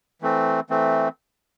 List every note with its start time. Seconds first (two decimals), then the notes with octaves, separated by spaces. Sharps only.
0.22 E3 A3 C4
0.70 E3 A3 C4